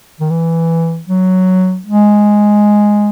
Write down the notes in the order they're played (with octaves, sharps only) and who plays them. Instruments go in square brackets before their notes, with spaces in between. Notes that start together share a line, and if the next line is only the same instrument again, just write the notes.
[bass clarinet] D#3
E3
F#3
G#3